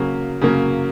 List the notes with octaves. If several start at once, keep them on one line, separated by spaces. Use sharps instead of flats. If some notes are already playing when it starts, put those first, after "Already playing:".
Already playing: C#3 F#3 A#3
C#3 F#3 A#3